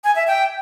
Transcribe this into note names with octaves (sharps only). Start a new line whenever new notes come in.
G#5
E5
G5